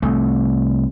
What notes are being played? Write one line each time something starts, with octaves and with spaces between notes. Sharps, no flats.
C2 A3